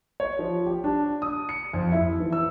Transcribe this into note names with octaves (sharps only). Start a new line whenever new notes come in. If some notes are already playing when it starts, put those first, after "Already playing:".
C#5
F3
G4
D4
D#6
C#7
F2
E4
E3
E6